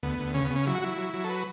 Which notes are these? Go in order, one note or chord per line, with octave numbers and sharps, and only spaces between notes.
D2 B3
D2
C#3 C#4
B3
C#3 C#4
F#3 E4
F#4
F#3 E4
F#3
F#3
A4
B4